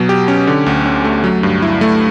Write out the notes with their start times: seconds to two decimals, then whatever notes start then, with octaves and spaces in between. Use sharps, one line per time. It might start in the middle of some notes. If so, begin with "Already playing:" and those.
Already playing: B2 F#3
0.09 G4
0.28 C#4
0.47 D3
0.66 D2
0.86 C#4
1.04 A3
1.24 F#3
1.43 G2
1.62 E4
1.81 A3